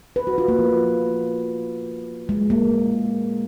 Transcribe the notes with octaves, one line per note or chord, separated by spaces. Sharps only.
B4
F#4
F4
A#3
F3
G#3
A#3